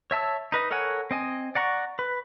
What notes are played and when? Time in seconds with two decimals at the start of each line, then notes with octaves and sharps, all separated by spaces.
0.11 C#5 E5 A5 E6
0.52 D#4 B4 D#5
0.71 A4 A#4 C#5 F#5 G#5
1.11 C4 D#5 G#5
1.55 D5 F#5 A#5 C#6
1.99 B4